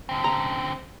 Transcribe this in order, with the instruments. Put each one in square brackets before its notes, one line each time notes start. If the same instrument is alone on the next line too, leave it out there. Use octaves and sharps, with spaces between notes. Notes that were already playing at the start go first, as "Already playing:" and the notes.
[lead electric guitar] D3 C4
[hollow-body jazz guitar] A#5